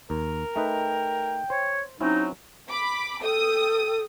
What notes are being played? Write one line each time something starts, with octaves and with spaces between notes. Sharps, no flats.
D#2 A#4
A3 D#4 B4 G5
C5 C#5
F#3 C4 C#4 D#4 E4
B5 D6
A4 G5 D#6